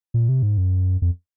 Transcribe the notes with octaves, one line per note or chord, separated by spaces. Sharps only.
A#2
C3
G#2
F#2
F2